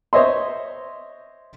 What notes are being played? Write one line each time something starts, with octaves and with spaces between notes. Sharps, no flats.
C5 C#5 D#5 E5 C6